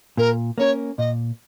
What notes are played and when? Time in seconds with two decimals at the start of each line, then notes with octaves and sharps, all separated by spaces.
0.17 A#2 A#4
0.58 A#3 C#4 A#4 C#5
0.98 A#2 D#5